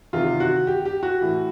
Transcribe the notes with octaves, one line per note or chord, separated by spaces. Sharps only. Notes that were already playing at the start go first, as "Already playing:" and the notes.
E2 C3 D#3 F4
F#4
G4
G4
F#4
A2 E3